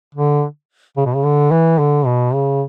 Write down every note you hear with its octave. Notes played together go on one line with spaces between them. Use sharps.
D3
C#3
B2
C#3
D3
E3
D3
B2
C#3